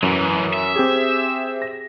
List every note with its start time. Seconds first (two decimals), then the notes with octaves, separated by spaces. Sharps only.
0.03 F#2 E3 F#3
0.54 E5
0.76 C4 G4 G#4
1.62 A#6